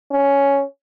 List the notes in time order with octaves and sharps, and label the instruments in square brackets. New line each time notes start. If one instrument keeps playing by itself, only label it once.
[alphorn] C#4